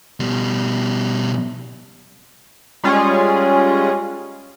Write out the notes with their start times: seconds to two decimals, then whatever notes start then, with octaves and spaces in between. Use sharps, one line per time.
0.20 B2 G3
2.84 G3 G#3 C#4 F4 G#4